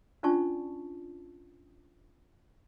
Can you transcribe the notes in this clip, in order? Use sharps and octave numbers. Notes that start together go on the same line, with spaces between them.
C#4 D4 F4 D5 A5 C#6